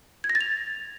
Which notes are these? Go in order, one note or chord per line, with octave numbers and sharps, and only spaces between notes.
G#6
A#6
A6
F7